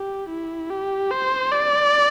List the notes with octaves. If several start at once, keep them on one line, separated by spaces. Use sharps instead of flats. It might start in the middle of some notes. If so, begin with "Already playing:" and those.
Already playing: G4
E4
G4
C5
D5